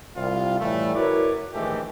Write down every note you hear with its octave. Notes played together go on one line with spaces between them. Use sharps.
C2 F4
A2 E3 G3 A3
E4 F#4 A#4 B4 C#5 D5
A#1 G#2 D#3 E3 A3 G4